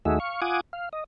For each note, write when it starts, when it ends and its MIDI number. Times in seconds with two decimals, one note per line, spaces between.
0.05 0.19 39
0.05 0.19 57
0.05 0.19 63
0.05 0.19 66
0.05 0.19 68
0.05 0.19 76
0.20 0.40 77
0.20 0.40 85
0.42 0.61 65
0.42 0.61 78
0.42 0.61 80
0.42 0.61 86
0.42 0.61 87
0.73 0.89 77
0.93 1.04 75